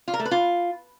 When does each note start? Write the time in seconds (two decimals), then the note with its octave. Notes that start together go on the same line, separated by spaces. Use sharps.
0.08 F4
0.14 A#4
0.19 A3
0.25 B4
0.31 F4